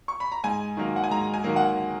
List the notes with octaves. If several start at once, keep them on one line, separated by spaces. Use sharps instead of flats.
C#6
B5
A#5
G#2 G#5
D#3 F#3 A#3
F#5
G#5
G#2 A#5
G#5
D#3 F#3 A#3
F#5